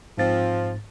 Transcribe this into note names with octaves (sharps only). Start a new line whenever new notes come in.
G#2 F3 C4 A6